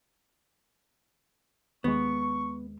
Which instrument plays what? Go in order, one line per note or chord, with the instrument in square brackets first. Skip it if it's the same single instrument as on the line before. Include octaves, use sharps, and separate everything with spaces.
[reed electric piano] D#2 G#3 [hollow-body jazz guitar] B3 [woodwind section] C#6